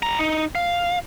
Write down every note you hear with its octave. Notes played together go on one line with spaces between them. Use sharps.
G3 A#5
D#4
F5